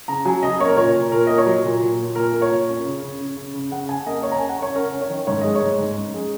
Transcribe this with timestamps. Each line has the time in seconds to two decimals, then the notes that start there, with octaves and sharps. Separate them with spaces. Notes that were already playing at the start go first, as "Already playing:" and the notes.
0.08 C#3 A#5
0.25 F#3 G#5
0.42 C#3 D#5
0.60 A#3 C#5
0.68 A#4
0.77 A#2 C#5
0.95 A#2
1.12 A#2 A#4
1.27 A#3 D#5
1.38 C#5
1.46 F#3
1.64 A#2
1.81 A#2
1.98 A#2
2.15 A#2 A#4
2.32 A#3
2.42 C#5
2.51 A#2
2.68 C#4
2.85 C#3
3.03 C#3
3.20 C#3
3.37 C#3
3.54 C#3
3.71 C#3 F#5
3.88 C#3 G#5
4.06 A#3 D#5
4.23 C#4 C#5
4.32 A#5
4.36 C#3 G#5
4.49 F#5
4.58 C#4 C#5
4.75 C#4 A#4
4.92 C#4
5.01 C#5
5.10 D#3
5.27 G#2 C#5
5.41 G#3 D#5
5.55 C#5
5.62 G#2
5.78 G#2
5.97 C#4
6.14 G#3